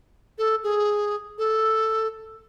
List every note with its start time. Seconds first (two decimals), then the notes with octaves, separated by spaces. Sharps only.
0.38 A4
0.63 G#4
1.38 A4